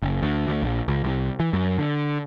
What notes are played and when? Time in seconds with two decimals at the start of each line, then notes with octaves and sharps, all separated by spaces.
0.02 F#1
0.22 D2
0.48 D2
0.62 A#1
0.88 C#2
1.04 C2
1.40 E3
1.53 F#2
1.78 D3